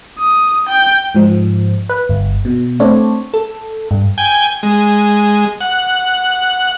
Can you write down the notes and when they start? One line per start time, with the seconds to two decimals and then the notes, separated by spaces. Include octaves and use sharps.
0.19 D#6
0.69 G5
1.15 G#2 F3
1.89 B4
2.09 G1
2.45 B2
2.80 A3 C4 D4 C#5
3.34 A4
3.91 G2
4.18 G5 G#5
4.63 G#3
5.61 F#5